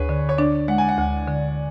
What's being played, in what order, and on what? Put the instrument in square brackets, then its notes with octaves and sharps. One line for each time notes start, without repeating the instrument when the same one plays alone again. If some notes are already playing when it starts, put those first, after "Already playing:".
Already playing: [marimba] D2 [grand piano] G#4 B4 C#5
[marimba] D3
[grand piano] C#5
[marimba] D4 [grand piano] D5
[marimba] G#3 [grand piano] F#5
[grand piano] G#5
F#5
[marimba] D2
D3